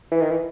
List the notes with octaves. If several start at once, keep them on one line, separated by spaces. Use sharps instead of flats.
E3
D#3
E3